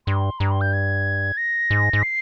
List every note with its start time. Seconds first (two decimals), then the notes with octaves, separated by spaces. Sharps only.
0.07 G2 C6
0.39 G2 A#5
0.51 C6
0.61 G6
0.73 G#6
1.37 A#6
1.71 G#2
1.93 G#2
2.03 C7